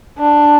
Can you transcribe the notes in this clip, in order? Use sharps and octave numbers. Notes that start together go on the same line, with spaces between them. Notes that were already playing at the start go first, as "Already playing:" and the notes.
D4